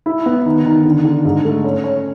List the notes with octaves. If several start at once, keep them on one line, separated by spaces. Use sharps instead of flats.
E4
B3
D#3
D#3
D3
D3
G#2
A3
C#4
C#4